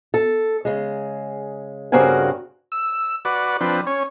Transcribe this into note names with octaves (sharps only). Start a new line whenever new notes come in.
A4
C#3 G#3
G2 C#3 C4 F#4 A#4 G#5
E6
F#4 B4 D5
F3 C4 D4 B4
C#4 C#5